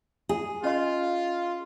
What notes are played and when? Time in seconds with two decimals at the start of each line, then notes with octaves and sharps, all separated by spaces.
0.29 G#4
0.63 C#4 F4 D#5 C6